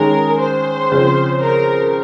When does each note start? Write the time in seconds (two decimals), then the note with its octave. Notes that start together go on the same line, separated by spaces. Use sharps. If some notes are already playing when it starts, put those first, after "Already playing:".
Already playing: D#3 G#3 C#4 G#4 A#4
0.41 C5
0.92 C#3 F3 C4
1.42 A#4